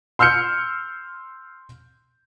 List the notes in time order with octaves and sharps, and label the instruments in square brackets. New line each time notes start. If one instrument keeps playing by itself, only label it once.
[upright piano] C6 E6 F6 G6 C#7